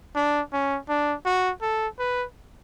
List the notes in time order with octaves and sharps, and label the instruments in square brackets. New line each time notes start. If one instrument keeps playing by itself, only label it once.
[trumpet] D4
C#4
D4
F#4
A4
B4